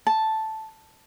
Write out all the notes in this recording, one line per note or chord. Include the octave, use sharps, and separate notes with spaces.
A5